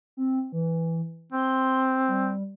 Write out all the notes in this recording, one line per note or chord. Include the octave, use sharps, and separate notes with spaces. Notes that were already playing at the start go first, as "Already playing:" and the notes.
C4
E3
C4 C6
G3